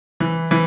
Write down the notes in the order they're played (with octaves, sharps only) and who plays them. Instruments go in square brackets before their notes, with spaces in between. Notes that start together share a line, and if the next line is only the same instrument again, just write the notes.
[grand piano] E3
E3